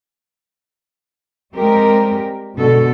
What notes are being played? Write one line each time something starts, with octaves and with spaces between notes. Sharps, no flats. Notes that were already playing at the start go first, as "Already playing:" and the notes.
G3 G#3 C4 G4 A#4
B2 D3 G#3 A4